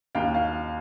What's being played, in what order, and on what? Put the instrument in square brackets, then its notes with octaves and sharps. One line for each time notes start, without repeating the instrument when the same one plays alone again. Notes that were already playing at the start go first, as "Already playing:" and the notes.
[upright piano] D#2 F5 G5
F5